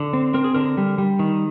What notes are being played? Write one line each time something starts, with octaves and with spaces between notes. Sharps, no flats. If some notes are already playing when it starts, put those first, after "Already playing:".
Already playing: D3
C4
C4 A#4
G#4
D3 A#4
G3
G3
D#3